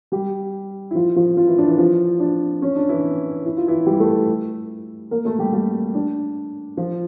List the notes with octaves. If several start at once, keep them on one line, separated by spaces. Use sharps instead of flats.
G3 G4
E4
F3 F4
F3 F4
F3 F4
E3 E4
D4
E3 E4
F3 F4
D4
C#4
D4
E3 E4
E4
F4
E3 E4
G3 G4
A3 A4
A#3 A#4
A3 A4
G3 G4
G3 G4
D4
F3 F4